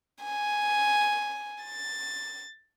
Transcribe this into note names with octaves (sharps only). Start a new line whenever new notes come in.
G#5
A6